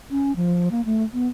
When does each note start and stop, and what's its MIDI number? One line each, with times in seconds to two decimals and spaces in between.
0.11 0.35 61
0.36 0.69 53
0.71 0.84 58
0.85 1.03 57
1.14 1.28 59